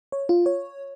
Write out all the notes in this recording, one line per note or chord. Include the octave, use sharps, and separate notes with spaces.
C#5
F4
C#5